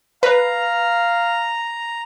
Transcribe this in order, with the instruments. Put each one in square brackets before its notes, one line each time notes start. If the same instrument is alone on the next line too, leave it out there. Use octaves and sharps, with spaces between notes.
[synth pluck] B4 [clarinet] F5 [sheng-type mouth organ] A#5